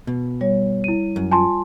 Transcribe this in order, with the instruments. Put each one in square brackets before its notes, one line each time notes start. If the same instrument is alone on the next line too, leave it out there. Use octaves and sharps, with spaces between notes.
[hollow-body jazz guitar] B2
[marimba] G3 C#5
[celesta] E4 D#7
[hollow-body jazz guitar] F#2
[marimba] F4 [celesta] G#5 A5 C6